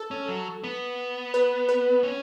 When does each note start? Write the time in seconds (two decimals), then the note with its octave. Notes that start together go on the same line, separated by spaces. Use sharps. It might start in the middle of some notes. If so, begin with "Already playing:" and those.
Already playing: A4
0.11 C#4
0.28 F#3
0.64 B3
1.34 B4
1.69 B4
2.03 C#4